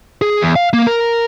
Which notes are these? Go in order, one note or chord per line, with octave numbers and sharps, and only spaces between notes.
G#4
E2
F5
A#3
A#4